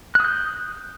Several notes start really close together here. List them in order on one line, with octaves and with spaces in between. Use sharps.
F#6 D#6 G6